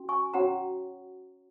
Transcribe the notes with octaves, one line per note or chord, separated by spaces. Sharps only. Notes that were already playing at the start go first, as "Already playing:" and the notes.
Already playing: C#4 F#4
G#5 C#6
C#4 F#4 C#5 F#5 A#5